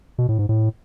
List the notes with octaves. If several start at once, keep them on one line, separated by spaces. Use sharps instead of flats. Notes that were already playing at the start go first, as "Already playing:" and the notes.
B2
A2
G#2
A2